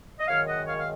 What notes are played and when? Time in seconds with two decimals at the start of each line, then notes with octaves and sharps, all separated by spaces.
0.20 D#5
0.28 F#2 D#3 G#3 C#5 F5
0.48 D#5 F#5
0.67 C#5 F5
0.78 F5